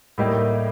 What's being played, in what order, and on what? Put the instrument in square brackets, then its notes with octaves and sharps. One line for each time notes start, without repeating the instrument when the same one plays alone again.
[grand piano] A2 G3 A#3 D#4 G4